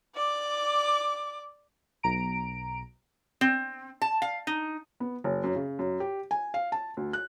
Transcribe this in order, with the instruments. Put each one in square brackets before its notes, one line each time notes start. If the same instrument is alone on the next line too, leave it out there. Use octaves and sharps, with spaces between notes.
[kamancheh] D5 D6
[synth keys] B1 A#5 D7
[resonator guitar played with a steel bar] C4
A5
F5
D#4
[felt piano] B3
F#1
F#2
C#3
F#2
G4
G#5
F5
A5
D2
F#6